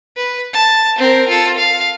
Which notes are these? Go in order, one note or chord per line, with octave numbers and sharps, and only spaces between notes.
B4
A5
C4 A#4
F4 A4
F5